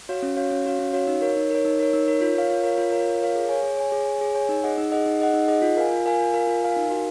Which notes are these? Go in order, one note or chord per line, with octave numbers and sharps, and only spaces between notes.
F#4 C#5 F5
C#4
F#4 C#5 F5
C#4
F#4 C#5 F5
C#4
F#4 C#5 F5
D#4
A#4 C#5
D#4
A#4 C#5
D#4
A#4 C#5
D#4
A#4 C#5
F4
A#4 C#5 F5
F4
A#4 C#5 F5
F4
A#4 C#5 F5
F4
A#4 C#5 F5
G#4
C#5 G#5
G#4
C#5 G#5
G#4
C#5 G#5
G#4
C#5 G#5
D#4
G#4 D#5 F#5
D#4
G#4 D#5 F#5
D#4
G#4 D#5 F#5
D#4
G#4 D#5 F#5
F4
A#4 F5 G#5
F4
A#4 F5 G#5
F4
A#4 F5 G#5
F4
A#4 F5 G#5
D#4
F#4 A#4 F5